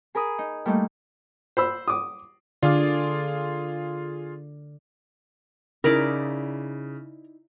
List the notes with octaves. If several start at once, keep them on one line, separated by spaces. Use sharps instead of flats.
G#4 A#4 B5 D#6
D#4
G3 A3 A#3 D#4
C5 B5 E6
D6 D#6
D3 F4 G#4 D5 F5
C#3 D#4 E4 A#4 D5